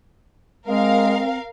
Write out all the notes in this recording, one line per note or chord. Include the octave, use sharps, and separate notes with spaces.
G#3 C4 A#4 F5